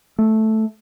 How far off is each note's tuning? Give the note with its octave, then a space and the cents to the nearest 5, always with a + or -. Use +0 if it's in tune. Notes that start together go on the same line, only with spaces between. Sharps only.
A3 -5